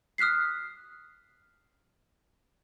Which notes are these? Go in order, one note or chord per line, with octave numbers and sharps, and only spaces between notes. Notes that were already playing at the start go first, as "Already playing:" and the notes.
D#6 F6 F#6 B6 C7